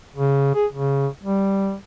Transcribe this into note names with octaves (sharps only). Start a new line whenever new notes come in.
C#3
G#4
C#3
G3